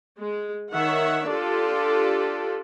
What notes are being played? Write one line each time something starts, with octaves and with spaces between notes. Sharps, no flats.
G#3
D#3 C#5 E5 F#5
D4 F4 G4 A4 D5